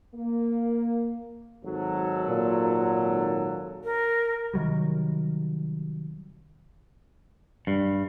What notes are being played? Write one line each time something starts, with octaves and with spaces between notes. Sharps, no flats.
A#3
G#1 F#3 A4
A#2
A#4
C3 D#3 F#3 G3
G2